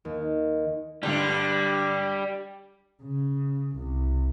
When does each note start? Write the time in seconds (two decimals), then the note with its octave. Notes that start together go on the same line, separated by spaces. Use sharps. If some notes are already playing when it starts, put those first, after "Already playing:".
0.05 D#2
1.03 G2 D3 G3 G4
3.03 C#3
3.76 C2